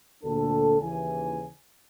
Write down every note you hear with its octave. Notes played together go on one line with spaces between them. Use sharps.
D2 A#2 C4 D4 A4
D#2 C#3 E3 G#5